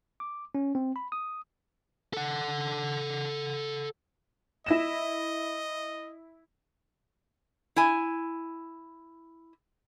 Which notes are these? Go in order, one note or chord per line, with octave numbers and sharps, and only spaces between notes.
D6
C#4
C4
B5
D#6
A4 F#5
E4 D#5 A#6 E7
E4 G#5